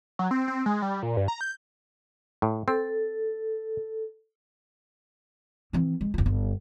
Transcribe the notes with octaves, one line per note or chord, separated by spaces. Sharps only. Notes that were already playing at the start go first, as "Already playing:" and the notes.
F#3
C4
C4
G#3
G3
A#2
G2
A#5
G6
A2
C4 A4
E3 C4
G#3
F#1 F4
G1